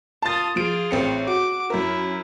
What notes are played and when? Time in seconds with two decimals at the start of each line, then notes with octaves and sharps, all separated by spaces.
0.22 F4 A5 D#6 A6
0.56 F3 F4 G#4 D7
0.91 A1 C4 C#7
1.27 F#4 D6
1.70 F#2 E4 A#4